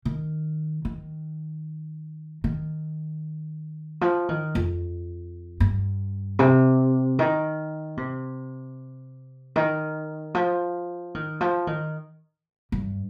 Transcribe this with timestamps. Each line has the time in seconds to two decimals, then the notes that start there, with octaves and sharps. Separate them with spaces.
0.05 D#3
0.85 D#3
2.44 D#3
4.01 F3
4.29 D#3
4.55 F2
5.60 G2
6.39 C3
7.19 D#3
7.97 C3
9.56 D#3
10.35 F3
11.15 D#3
11.41 F3
11.67 D#3
12.72 G2